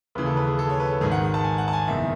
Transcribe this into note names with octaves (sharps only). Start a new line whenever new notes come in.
D#2 C#3 E3 B4
A4
B4
G#4
A4
C#5
B4
A4
G#1 G#2 D#3 G#4
F#5
A5
G#5
F#5
A5
G#5
F#1 E2 D#3 E5